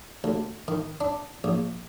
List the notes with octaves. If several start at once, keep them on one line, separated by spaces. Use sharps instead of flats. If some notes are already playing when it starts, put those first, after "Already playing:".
D2
D#3
D4
A#1